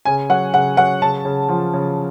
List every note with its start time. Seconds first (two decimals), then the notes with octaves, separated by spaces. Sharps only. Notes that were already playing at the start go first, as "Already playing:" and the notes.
0.05 C#3 G#5
0.30 F#3 F#5
0.54 C#3 F#5
0.77 F#3 F#5
1.02 C#3 A5
1.25 C#3
1.49 F3
1.73 C#3